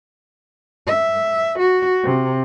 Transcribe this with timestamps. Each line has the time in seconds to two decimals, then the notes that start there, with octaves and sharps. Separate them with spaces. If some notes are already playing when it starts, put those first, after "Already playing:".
0.87 E5
1.59 F#4
2.04 C3